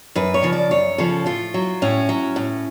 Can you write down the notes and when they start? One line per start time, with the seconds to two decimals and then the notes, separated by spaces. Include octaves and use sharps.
0.15 F#2 B4
0.34 C#5
0.43 C#3 F3
0.52 D5
0.71 F#2 C#5
0.98 C#3 F3 A4
1.26 A2 F4
1.54 F#3
1.82 A2 C#4
2.09 F#3
2.36 A2